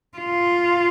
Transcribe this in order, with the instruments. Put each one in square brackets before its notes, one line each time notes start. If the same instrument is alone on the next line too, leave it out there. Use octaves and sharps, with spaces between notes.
[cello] F4